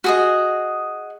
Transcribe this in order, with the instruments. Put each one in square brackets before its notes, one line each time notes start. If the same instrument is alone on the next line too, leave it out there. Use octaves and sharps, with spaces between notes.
[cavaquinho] F#4 G#4 D#5